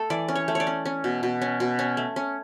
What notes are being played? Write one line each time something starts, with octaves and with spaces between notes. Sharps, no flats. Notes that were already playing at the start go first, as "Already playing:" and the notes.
Already playing: A3 A4
E3 D5
C#4
C#5
A3
C#5 D5
C#4
C#4
B2
B2
C#4
B2
C#4
A3
C#4